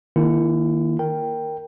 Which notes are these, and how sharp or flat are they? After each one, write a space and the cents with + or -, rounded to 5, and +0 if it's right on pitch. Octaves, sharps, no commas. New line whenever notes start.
D#3 +0 A#3 +0 E4 +35
A#4 +0 G5 +0